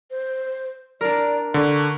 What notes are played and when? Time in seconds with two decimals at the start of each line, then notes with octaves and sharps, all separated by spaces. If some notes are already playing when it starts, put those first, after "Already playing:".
0.11 C5
1.01 D4 A#4 D5
1.54 D3 C#6